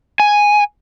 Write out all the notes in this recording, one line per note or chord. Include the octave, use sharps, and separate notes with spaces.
G#5